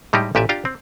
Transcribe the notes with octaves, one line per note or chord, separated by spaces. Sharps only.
A2 G3 G#3 D#4 G4
A1 A#2 G4 B4 D5 E5
D4 F4 G4 F5 G5 A#5
C4